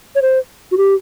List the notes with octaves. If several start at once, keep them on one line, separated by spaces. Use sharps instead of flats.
C#5
C5
F#4
G4